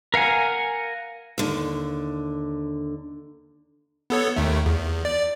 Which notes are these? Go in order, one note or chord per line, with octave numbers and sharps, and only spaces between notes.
A#4 F5 F#5 G#5
D#2 D3
B3 A4 C#5
D#2 D#3 A3
E2
D5